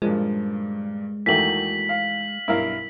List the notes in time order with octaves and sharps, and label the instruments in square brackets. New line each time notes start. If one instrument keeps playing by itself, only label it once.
[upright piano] G2 A#2 D#3 [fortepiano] F3 [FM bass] G#3
[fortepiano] E2 D#3 A3 [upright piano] A#3 F#4 G5 [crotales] B6 F#7
[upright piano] F5
[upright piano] B1 G2 [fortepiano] E4 A#4 F5